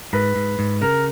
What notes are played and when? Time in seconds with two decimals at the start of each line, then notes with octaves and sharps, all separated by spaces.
0.13 G#2 B4
0.36 G#2
0.59 G#2
0.81 C#3 A#4